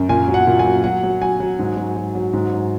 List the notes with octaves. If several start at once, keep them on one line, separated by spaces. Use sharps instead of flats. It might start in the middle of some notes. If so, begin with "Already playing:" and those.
Already playing: F#2
A#2 G#5
F#3
F#5
A#2
G#5
F#3
F#3 F#5
F#3
F#3 G#5
F#3
G#2
F#3
F#3
F#3
G#2
F#3